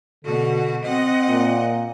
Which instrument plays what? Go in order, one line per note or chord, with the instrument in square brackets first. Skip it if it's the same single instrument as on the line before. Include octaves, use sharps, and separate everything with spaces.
[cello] B2 F#4 [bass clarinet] D3
[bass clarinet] C4 [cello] D#5 F#5
[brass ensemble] A#2